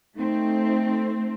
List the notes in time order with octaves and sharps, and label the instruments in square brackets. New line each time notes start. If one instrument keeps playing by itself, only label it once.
[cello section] A3 C4 [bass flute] D#4